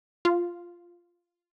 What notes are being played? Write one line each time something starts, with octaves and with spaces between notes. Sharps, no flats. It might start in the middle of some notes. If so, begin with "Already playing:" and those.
F4